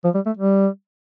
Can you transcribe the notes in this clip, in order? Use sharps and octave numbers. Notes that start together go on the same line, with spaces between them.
F3
G3
A3
G3